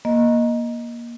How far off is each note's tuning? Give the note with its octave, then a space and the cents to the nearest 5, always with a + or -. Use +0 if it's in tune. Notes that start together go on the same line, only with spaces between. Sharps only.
A#3 +20 D#5 +0